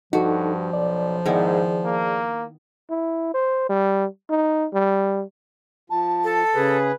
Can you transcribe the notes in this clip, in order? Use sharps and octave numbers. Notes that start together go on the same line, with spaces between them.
G2 F3 D#4 F#4 A4
B1 D5
G#2 D#3 B3 E4 G#4 D5
A#3
E4
C5
G3
D#4
G3
F3 A5
A4
C#3 G#4 B4